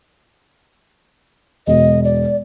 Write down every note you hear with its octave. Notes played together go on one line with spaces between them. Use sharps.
E1 D#5
D5